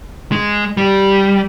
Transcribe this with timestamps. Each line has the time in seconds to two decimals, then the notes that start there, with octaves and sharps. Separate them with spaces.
0.32 G#3
0.77 G3